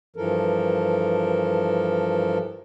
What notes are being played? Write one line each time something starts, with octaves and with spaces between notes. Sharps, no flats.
G2 E3 F3 A4 A#4